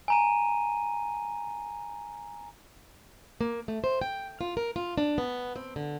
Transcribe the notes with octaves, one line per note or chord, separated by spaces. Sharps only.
G#5 A#5 D#7
A#3
A3
C5
G5
F4
A#4
F4
D4
B3
C4
D3